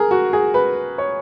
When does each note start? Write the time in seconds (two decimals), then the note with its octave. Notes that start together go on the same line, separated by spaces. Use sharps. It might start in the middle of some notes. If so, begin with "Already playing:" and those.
Already playing: G#4 A#4
0.11 F#4
0.33 G#4
0.54 B4
0.98 C#5